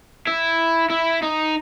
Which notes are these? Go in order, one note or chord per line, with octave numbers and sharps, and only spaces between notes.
E4
E4
D#4